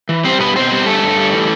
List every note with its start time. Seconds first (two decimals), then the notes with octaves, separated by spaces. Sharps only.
0.09 E3
0.24 G3 C4 C5
0.39 B2 B3 B4
0.56 B2 C4 C5
0.71 G3
0.86 G2 A3 A4
1.02 G2
1.17 G3
1.33 E3